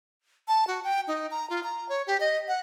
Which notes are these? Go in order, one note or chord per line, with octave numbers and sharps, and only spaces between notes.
A5
F#4
G5
D#4
A#5
F4
A#5
C#5
G4
D#5
F#5